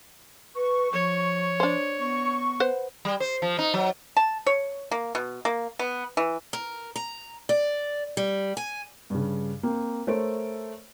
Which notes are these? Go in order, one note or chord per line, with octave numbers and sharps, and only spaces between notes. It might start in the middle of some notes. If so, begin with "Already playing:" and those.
B4 C#6
F3 C#5
D4 C5
B3 C#6
B4 C5 F#5
G3
C5
F3
D#4
F#3
A5
C#5
A#3
B2
A#3
B3
E3
A#4
A#5
D5
G3
G#5
G2 C#3
A#3 C4
A3 A4 A#4 C5 C#5 D7